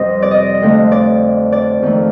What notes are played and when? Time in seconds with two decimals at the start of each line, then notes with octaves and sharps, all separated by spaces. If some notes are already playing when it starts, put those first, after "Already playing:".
Already playing: F2 C3 G3 C5 D#5
0.22 D5
0.31 D#5
0.62 F2 D3 F3 A3
0.92 D5
1.52 D5
1.82 F2 D#3 A3